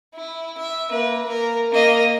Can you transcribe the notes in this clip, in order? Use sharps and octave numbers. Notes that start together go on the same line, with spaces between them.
E4
E5
A#3 B4
A#3 A#4
A#3 D#5